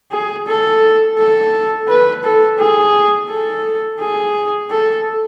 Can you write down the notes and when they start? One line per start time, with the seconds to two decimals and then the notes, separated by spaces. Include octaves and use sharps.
0.11 G#4
0.47 A4
1.18 A4
1.88 B4
2.24 A4
2.59 G#4
3.29 A4
3.99 G#4
4.70 A4